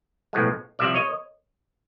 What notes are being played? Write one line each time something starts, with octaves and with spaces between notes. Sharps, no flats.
B1 A2 F3 G#3
C2 C3 F3 D5 E5
C#5 D#5